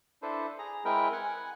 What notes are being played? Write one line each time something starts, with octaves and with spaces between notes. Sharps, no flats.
D4 E4 A4 B4 C5
G#4 A#5
G#3 C4 E4 A#4 B4 G5
F#5 G#5